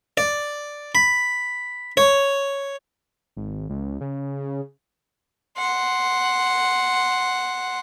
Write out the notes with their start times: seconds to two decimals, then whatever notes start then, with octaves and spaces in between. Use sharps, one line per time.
0.17 D5
0.95 B5
1.97 C#5
3.37 G#1
3.70 C#2
4.01 C#3
5.58 F#5 C6